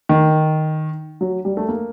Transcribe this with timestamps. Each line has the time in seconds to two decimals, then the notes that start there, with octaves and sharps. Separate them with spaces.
0.09 D#3
1.21 F#3
1.45 G3
1.57 A3
1.68 A#3